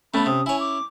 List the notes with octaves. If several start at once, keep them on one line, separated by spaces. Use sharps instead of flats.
A3 B3 C#4 A5 B5
C3 D#6
E4 C#5 G#5
D6